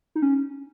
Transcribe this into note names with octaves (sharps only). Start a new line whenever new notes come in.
D#4
C#4